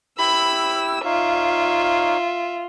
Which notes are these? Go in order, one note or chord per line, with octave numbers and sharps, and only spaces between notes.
E4 G4 B5 E6
D#4 F4 C#5 E5 F5